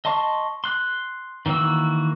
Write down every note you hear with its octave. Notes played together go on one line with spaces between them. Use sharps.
D#5 A5 C6 C#6
C6 F#6
D#3 E3 A#3 F#4 E6